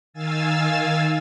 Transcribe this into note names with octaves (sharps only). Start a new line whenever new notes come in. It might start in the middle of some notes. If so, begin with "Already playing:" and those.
D#3 F5 G#5 E6 A6